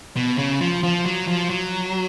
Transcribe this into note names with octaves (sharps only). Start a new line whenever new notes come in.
B2
C#3
F3
F3
F#3
F3
F#3